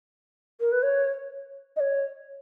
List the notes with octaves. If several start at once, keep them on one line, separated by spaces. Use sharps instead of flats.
A#4
B4
C#5
D#5
C#5